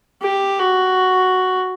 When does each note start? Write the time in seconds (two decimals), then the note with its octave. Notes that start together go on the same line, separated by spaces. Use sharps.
0.23 G4
0.59 F#4